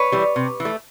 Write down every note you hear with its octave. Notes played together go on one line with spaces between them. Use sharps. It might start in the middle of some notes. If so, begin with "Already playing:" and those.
Already playing: B4 C#5
E3 G3
C3
E3
A3